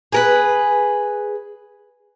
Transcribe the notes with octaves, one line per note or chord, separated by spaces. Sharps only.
G#4 A#4 B4